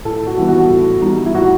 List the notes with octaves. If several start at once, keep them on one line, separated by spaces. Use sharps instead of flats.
A2 A4
F#4
E3 G3 B3 D#4
F#4
A2
E3 G3 B3 D#4
E4
A2 F#4